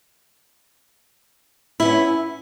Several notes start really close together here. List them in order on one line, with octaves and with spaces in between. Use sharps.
E4 B3 C#4